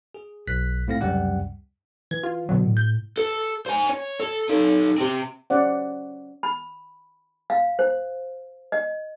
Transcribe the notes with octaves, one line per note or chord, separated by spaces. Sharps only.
G#4
B1 F#6 B6
G#2 A3 C4 E4 F5 A#6
C#2 F#2 C3 G3 G4 F#5
E3 G#6
F4
B2 D3 F#3
A2
G6
A4
C5 G#5
C#5
A4
D#4 A4
C4 G4
C#4 C5 D5 F#5
B5
F5
C5
D#5